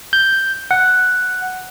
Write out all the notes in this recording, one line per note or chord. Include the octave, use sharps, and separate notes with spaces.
G6
F#5